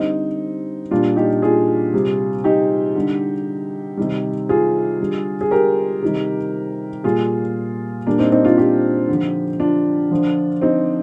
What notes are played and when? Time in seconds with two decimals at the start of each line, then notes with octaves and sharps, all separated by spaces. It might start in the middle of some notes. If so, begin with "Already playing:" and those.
Already playing: D3 G3 C4 D#4
0.91 A#2 G3 D4 F4
1.16 D#4 G4
1.42 F4 G#4
1.94 C3 G3
2.44 D#4 G4
2.95 D3 G3
3.97 C3 D#3 G3
4.49 F4 G#4
5.00 D3 G3
5.41 G#4
5.51 G4 A#4
6.02 C3 D#3 G3
7.04 A#2 G3 F4 G#4
8.06 A#2 G3 A#3 D4
8.19 C4 D#4
8.32 C4 D#4
8.44 D4 F4
8.57 D#4 G4
9.08 D3 F3
9.60 D4 F4
10.11 D3 F3
10.62 C4 D#4